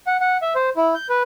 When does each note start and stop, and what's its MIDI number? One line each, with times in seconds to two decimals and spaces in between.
0.07 0.17 78
0.21 0.37 78
0.42 0.54 76
0.55 0.70 72
0.77 0.94 64
0.95 1.07 91
1.09 1.23 71